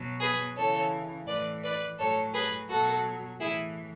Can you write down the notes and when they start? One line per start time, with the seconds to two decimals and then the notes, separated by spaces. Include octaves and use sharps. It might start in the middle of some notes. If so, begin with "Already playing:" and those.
Already playing: B2 F#3
0.20 G#4 B4
0.56 C#3 E3 A4 C#5
1.27 A2 E3 B4 D5
1.63 B4 D5
1.99 A2 F#3 A4 C#5
2.33 G#4 B4
2.69 B2 F#3 F#4 A4
3.40 A2 E3 E4 G#4